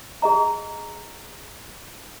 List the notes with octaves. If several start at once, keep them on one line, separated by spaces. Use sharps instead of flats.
G#4 D#5 A#5